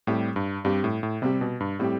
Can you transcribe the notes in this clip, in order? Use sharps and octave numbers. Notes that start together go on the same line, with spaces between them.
A2 G3 C4 G4
G2
G2 G3 C4 G4
A2
A2
C3 G3 C4 G4
B2
G2
A2 G3 C4 G4